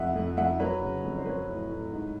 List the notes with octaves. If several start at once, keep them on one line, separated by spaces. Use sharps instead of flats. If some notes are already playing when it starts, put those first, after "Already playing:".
Already playing: F2 E5 F#5
F2
F2 E5 F#5
F#3 B4 C#5
C#3
F2
C5
F#3 B4 C#5
A2
A2
G#2